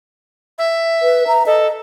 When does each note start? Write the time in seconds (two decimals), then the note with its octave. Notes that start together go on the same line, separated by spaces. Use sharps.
0.58 E5
1.02 B4
1.27 A#5
1.46 A4 D#5